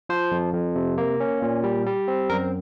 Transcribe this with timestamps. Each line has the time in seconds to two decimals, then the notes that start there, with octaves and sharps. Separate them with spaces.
0.09 F3 C5
0.32 F2
0.54 F2
0.75 C3
0.98 A#3
1.20 C#4
1.42 A#2
1.63 G3
1.86 G3
2.08 C4
2.30 F#2 A#4